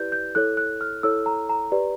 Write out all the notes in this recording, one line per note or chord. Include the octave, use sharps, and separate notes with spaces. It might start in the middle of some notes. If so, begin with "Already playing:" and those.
Already playing: E4 G4 B4 D5 G6
G6
E4 A4 C#5 F#6
F#6
F6
E4 A4 C#5 E6
A#5
A#5
G4 B4 D5